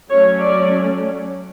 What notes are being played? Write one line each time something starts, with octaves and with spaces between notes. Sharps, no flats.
F#3 A3 C#4 C#5
D5